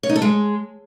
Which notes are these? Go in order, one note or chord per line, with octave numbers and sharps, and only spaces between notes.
C#5
D#4
A4
G#3